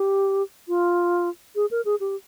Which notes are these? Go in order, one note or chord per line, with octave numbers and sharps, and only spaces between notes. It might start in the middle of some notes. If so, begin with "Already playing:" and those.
Already playing: G4
F4
G#4
A#4
G#4
G4